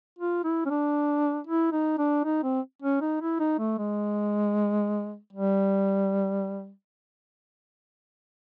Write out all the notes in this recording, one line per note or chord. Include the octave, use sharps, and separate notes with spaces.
F4
E4
C#4
D4
E4
D#4
D4
D#4
C4
C#4
D#4
E4
D#4
A3
G#3
G3